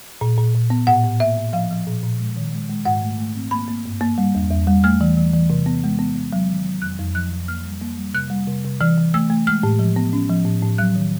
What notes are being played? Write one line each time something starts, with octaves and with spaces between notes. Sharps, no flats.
A#2
A#2
A#2
B3
A2 F#5
A2
A#3 E5
A2
F3 F5
F3
A#2
A#2
G#3
D#3
G#3
G#3
G#2 F#5
A3
A3
C4
A#3 B5
A#3
G2
A#3
G3
E2
E2
G3
A3 F6
E3
E3
E3
C3
B3
G#3
B3
B3
F#3
D#3
F#3
F2 F#6
F2
F3 F#6
F2
A#3 F6
G3
A#3
G3
C3 F#6
G3
C3
C3
E3 F6
E3
A3 E6
A3
G#3 F6
A2
F3
B3
C#4
F3
A2
A2
F#3 F#6
D#3